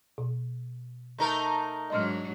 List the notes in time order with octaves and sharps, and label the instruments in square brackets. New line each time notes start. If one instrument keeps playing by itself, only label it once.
[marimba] B2
[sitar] A3 D#4 A#4
[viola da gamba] G#2 F#3 D4 [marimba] D#5 C6 F6